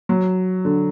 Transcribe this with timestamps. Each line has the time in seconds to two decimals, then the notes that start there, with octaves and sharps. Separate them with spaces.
0.09 F#3
0.65 D3